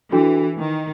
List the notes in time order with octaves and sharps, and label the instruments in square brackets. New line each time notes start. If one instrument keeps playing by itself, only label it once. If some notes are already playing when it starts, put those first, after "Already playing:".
[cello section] E3 [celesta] D4 F#4 A4
[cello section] D#3